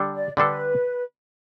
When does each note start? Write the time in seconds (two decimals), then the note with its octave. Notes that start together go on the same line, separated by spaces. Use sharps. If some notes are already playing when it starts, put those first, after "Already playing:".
Already playing: D3 G3 D4 A4
0.14 D5
0.36 D3 G3 D4 A4 B4